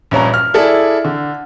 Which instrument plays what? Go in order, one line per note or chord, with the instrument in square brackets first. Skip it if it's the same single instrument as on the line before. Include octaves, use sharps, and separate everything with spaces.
[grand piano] A#1 G2 C#4 A#5
F6
E4 G#4 A4 D5
D3